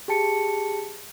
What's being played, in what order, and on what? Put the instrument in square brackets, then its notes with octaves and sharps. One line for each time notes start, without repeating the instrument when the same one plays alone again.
[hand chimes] G4 G#4 A5 C#7